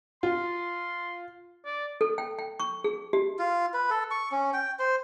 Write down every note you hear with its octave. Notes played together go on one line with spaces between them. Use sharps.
F4 C6
D5
A4
G5
G5
C#6
G#4
G4
F4
B4
A4
C#6
C#4
G5
C5